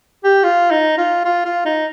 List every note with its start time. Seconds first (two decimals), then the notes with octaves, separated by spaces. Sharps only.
0.24 G4
0.44 F4
0.71 D#4
0.98 F4
1.25 F4
1.45 F4
1.65 D#4